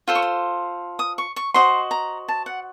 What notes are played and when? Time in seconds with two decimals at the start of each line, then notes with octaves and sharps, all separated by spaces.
0.08 F4 A4 C5 C6
0.15 C#6
0.22 C6
0.99 D#6
1.18 C#6
1.36 C#6
1.54 F#4 C5 D#5 C6
1.91 A#5
2.28 A5
2.46 F#5